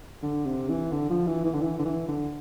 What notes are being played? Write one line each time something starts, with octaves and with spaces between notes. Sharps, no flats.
D3
C3
E3
D3
F3
E3
E3
D3
E3
D3
E3
D3